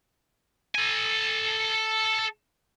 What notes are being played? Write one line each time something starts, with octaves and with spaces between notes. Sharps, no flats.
A4 G#5